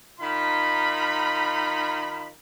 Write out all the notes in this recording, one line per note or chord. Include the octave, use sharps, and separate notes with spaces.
D#3 D#4 F4 B5